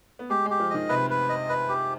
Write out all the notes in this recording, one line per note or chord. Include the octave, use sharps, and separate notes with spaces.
B3
G#3 G4
G#3 G4
F3
D#3 D#5
C3 B4
B4
D#5
B4
G4